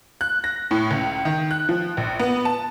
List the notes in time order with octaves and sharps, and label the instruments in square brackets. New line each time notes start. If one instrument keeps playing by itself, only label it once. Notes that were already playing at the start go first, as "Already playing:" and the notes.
[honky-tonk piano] F#6
A#6
A2
C#2
D#3
F#6
F3
A#1
B3
A5